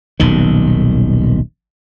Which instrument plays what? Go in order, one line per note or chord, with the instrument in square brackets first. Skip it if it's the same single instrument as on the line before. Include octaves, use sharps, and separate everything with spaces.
[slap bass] D#1 B1 D#3